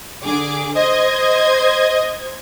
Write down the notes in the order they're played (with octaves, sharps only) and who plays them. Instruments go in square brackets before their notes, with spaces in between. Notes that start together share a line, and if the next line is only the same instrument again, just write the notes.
[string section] D3 G#4 D6
[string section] C5 G#6 [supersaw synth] D#5